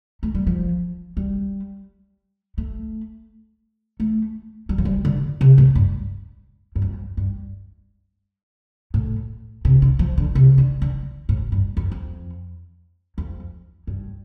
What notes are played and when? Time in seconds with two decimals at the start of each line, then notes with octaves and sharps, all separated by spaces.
0.23 A3
0.35 G3
0.47 F3
1.17 G3
2.58 A3
4.00 A3
4.69 G3
4.78 F3
4.85 G3
5.05 D3
5.41 C3
5.58 A2
5.75 G2
6.76 G2
6.82 F2
7.17 G2
8.94 A2
9.65 C3
9.82 D3
9.99 F3
10.18 D3
10.35 C3
10.58 D3
10.82 D3
11.29 A2
11.52 G2
11.77 F2
11.91 F2
13.18 F2
13.87 G2